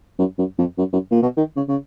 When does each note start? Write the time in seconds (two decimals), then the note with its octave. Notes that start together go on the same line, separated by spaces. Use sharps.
0.19 F#2
0.38 F#2
0.58 F2
0.78 F#2
0.93 F#2
1.11 A#2
1.22 B2
1.37 D#3
1.56 C#3
1.68 C#3